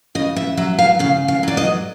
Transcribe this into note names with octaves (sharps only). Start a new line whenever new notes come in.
C#3 D#5
E5
F#3 E5
F5
C#3 F5
F5
F#3 D5
D#5